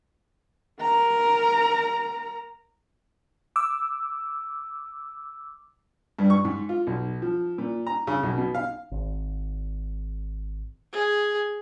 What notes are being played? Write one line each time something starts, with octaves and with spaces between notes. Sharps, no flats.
A#4 A#5
D6 E6
G2
C#6
G#2
F4
B1
F3
A#2
A#5
C#3
B1
B2
F5
G#1
G#4